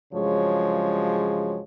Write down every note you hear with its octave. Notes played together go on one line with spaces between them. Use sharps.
G2 C#3 F3 F#3 G#3 C#5